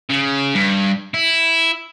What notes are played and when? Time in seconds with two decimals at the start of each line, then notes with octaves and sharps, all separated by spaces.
0.10 C#3
0.55 G2
1.14 E4